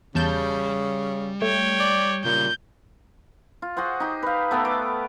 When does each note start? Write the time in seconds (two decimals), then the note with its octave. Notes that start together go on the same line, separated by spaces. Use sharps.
0.15 E2 C#3 G3 A5 G6
1.42 A3 C#5 G5
1.80 D5
2.25 A#2 C#3 G3 G6
3.62 F4
3.77 F#4 G#4 C5 F#5
4.00 D#4 G4
4.23 B4 F5
4.51 A3 B3 G4 A4
4.65 D6